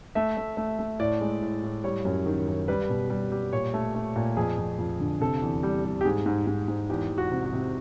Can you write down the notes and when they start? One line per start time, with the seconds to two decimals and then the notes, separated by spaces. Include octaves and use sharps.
0.15 A3 E5
0.37 A3
0.57 A3
0.79 A3
0.99 A2 D5
1.21 G#3
1.42 A2
1.63 A2
1.84 G3 C#5
2.05 F#2
2.26 D#3
2.47 F#2
2.68 G3 B4
2.89 B2
3.10 G3
3.32 G3
3.53 A#2 C#5
3.74 A3
3.95 A3
4.16 A#2
4.37 F2 G#4
4.58 F2
4.78 F2
5.00 D3
5.21 C3 A4
5.42 E2
5.63 G3
5.85 G3
6.01 G4
6.05 G#2 G#4
6.26 G#2
6.47 G#2
6.68 G#2
6.90 E2 G4
7.10 E2
7.18 F#4
7.32 C3
7.46 F#4
7.53 C3